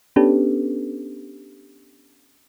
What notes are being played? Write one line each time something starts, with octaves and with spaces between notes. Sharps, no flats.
B3 C#4 D4 G4 A4 B4